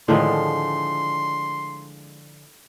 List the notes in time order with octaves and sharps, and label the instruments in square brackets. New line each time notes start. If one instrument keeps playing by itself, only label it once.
[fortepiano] A2 D#3 [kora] D3 F3 G#3 [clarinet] C6